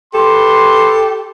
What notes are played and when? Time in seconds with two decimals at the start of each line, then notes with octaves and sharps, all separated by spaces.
0.14 G4 A4 B4 C6